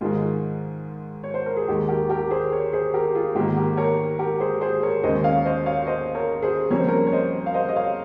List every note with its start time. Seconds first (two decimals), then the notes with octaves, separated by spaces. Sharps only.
0.01 G#2 D#3 G#3 F4
1.24 C#5
1.34 C5
1.46 A#4
1.57 G#4
1.68 D#2 D#3 G#3 G4
1.89 G4 A#4
2.09 G4 A#4
2.31 G#4 C5
2.52 A#4 C#5
2.73 G#4 C5
2.94 G4 A#4
3.15 F4 G#4
3.35 G#2 D#3 A#3 G4
3.57 G4 A#4
3.77 A#4 C#5
4.19 G4 A#4
4.40 G#4 C5
4.61 G#4 C5
4.83 A#4 C#5
5.03 D#2 C#3 G#3 C5 D#5
5.24 C#5 F5
5.45 C5 D#5
5.66 C#5 F5
5.87 C5 D#5
6.15 A#4 C#5
6.42 G#4 C5
6.71 F2 C#3 G3 A#3 C#5
6.79 C5
6.88 A#4 C#5
7.07 C#5
7.12 C5 D#5
7.46 F5
7.54 C5 D#5
7.69 D#5
7.76 C#5 F5